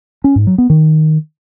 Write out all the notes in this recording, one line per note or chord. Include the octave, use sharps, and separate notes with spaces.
C#4
G#2
F#3
B3
D#3